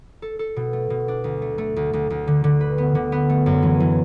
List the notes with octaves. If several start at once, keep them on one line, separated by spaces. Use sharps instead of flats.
A4
A4
B2
A3
B2
D4
D2
A3
A3
D2
D2
D2
D3
D3
B4
B3
D3
B3
A3
F#2
E3
E3